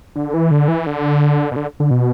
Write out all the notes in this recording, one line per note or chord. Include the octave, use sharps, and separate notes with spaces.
D3
E3
D3
E3
D3
B2
D3
D3
B2